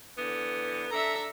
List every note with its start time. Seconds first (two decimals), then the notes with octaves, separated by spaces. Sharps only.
0.16 D3 E3 B3
0.91 D4 A4 E5 A#5